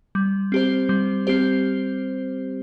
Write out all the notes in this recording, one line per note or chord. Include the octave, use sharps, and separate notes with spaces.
G3
C4 G4 C5
G3
C4 G4 C5